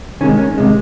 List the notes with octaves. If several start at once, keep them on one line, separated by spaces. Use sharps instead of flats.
C3 D#3 G#3 C#4
C#4
C3 D#3 G#3